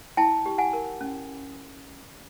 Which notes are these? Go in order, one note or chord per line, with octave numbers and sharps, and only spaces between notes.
E4 G5 A5
G4
F#5 G#5
A#4
C#4